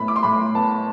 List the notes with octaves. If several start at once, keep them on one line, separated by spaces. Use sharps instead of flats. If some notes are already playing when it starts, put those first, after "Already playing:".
Already playing: A2 B3 B5
D6
C6
A2 B5
B3 A5